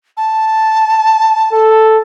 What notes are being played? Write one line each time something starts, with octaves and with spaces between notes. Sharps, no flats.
A5
A4